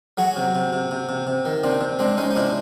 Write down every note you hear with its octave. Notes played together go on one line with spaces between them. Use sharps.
F#3 F#4 G#4
C3
C3
C3
C3
C3
C3
D#3
C3 C4 D4
C3
G#3 C4 D4
G#3 C#4 D#4
D#4
C3 D4 E4